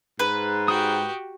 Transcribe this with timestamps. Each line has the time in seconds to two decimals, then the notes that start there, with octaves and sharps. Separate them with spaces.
0.19 G#2 B4
0.68 F#4 G4 G5 D#6